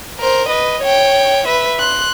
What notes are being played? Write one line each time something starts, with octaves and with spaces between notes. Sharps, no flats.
A#4 C5
B4 D#5
C#5 G5
B4 E5
C6 F#6